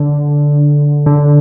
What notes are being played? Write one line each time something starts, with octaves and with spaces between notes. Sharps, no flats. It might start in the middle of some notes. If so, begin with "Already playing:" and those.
Already playing: D3
D3